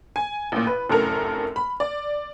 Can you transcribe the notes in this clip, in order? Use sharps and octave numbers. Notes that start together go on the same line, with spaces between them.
G#5
A1 A#2
B4
F1 F#2 A2 A4 A#4 F6
B5
D5